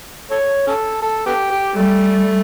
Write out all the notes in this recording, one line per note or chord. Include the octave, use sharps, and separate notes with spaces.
A4 C#5
C#4 A4
A4
B3 G4
G4
G3 A3